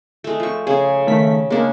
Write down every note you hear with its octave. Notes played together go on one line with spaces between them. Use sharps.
G#3 A3
F3 C#6
C#3 C#4 G#4
D#3 A3 B6
C#3 G#3 A#3 D4